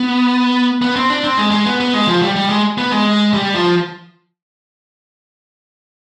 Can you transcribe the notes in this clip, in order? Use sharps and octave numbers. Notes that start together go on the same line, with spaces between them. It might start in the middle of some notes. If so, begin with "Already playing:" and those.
Already playing: B3
B3
C4
D4
C4
G#3
G#3
B3
B3
G#3
F3
G3
G3
G#3
B3
G#3
G3
F3